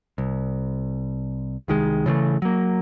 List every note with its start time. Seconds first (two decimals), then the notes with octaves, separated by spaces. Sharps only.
0.18 C2
1.68 C2 D#3 G#3
2.06 C#3 E3 G3 A3
2.42 F#3 A#3